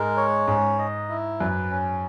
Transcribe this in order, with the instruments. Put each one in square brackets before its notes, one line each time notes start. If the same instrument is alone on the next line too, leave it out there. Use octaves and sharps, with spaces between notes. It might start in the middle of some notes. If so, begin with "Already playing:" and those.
Already playing: [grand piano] G#2 [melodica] G#3 A#4
[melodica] C#5
[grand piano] G#2 [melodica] C#4
[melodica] D#5
E4
[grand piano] F#2 [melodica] B4
[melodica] C#4